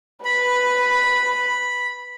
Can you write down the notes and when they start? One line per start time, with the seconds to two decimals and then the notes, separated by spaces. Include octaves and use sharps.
0.25 B4 B5